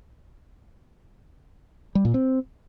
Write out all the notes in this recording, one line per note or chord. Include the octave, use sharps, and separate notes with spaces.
G3
A#2
C4